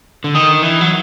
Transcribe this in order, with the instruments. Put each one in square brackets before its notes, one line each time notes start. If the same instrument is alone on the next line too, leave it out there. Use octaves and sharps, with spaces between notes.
[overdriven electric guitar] D3
[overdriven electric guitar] D#3 [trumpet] D#5
[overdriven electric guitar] E3
F#3